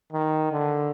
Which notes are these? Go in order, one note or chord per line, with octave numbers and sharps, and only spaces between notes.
D#3
D3